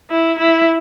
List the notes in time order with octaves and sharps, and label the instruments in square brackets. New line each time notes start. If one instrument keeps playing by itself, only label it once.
[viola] E4
E4